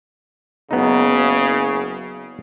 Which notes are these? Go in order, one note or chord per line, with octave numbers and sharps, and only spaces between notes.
F#1 C#3 B3 D#4